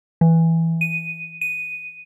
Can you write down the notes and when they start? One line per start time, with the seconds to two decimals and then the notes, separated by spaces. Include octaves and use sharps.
0.21 E3
0.81 D#7
1.41 D#7